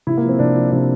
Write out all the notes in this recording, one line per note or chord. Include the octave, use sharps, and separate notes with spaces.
C3 E4
A#3
F3
C4
C3 D4
F3
C3 D4